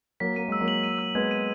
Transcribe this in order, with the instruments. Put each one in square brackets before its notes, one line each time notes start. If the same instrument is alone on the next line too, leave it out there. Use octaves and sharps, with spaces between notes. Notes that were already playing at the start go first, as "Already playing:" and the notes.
[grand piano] F#3 A#3 [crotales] B6
[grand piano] A#3 [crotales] D#7
[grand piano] G#3 [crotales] E6
[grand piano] F#3 A#3
[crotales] F#7
D#7
E6
[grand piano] G#3 B3 [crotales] G#6
[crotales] D#7